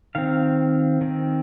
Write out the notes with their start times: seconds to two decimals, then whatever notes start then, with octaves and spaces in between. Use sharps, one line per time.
0.15 D#3 C4 F5
1.01 D#3 C4